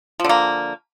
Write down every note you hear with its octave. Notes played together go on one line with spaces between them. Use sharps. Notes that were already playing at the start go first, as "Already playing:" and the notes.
D3 F3 A#3